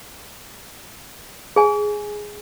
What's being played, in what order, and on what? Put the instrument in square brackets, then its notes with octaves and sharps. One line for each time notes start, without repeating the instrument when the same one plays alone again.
[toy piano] G#4 G#5